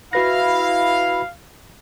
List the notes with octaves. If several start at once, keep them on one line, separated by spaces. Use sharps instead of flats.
E4 F#4 B4 F5 A#6